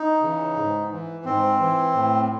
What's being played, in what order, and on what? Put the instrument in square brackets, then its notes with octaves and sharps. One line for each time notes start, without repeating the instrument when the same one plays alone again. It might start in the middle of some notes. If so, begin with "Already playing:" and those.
Already playing: [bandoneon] D#4
C#3 E3
G#2
E3
G#2 C4
E3
A2